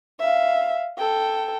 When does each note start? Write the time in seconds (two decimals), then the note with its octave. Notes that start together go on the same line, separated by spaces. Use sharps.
0.19 E5 F5
0.98 A4 G5